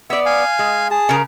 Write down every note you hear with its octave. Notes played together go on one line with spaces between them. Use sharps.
B3 D5 E5 E6
F5 G#5
G#3
G#4 A5
C#3 A#4